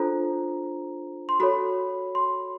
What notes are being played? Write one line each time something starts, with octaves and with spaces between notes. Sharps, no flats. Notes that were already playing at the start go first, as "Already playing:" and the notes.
Already playing: D4 F4 A4 C5 A#5
C6
F#4 A4 C#5 B5
C6